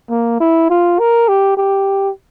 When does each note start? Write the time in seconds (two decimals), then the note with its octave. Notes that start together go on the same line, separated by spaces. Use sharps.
0.10 A#3
0.40 E4
0.70 F4
0.99 A#4
1.28 G4
1.57 G4